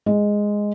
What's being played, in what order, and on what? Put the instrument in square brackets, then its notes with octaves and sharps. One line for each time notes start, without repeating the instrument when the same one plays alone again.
[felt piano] G#3